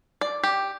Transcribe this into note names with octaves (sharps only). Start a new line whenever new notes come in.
D5
G4